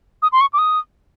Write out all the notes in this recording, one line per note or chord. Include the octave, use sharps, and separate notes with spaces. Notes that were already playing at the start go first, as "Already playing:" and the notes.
D#6
C6
C#6
D6
D#6